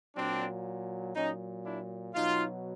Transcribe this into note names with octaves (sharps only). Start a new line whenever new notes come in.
A#2 F#3 C4 D4
A#2 F#3 C#4 D#4
D4 E4
B2 F#3 D#4 F4